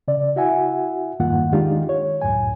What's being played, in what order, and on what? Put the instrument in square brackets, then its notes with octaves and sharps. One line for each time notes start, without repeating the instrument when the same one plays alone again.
[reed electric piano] C#3 D5
E4 F#4 E5 F#5 G#5
E2 G2 D#3 A#3 F4 F#5
D#3 G#3 D4 D#4 F4 G4
C#5
C#2 F#2 A2 G#5